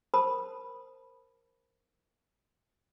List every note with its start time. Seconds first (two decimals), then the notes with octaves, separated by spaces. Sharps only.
0.14 A#4 C5 A5 B5 D#6